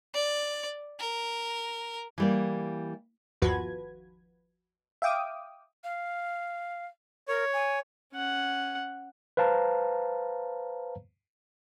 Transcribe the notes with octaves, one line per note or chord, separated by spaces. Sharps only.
D5
A#4
E3 G3 A#3
G1 D#2 F3 F#4 B4 G#6
E5 F5 G5 D6 D#6
F5
A#4 C#5
G#5
C#4 F#5
B4 C5 F5 A5 A#5